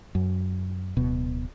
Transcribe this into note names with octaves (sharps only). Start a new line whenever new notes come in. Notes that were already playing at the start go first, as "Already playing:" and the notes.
F#2
D1 B2